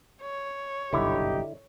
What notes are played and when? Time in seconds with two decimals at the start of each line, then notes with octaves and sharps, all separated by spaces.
0.22 C#5
0.93 F#1 B1 G2 D3 D#4 E4 G4